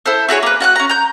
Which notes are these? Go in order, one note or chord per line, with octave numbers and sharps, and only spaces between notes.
E4 A4 C5
E4 F#4 G#4 C#5
A#3 B4
F#4 F#5 G5 F#6
C#4 A#5
A#5 G6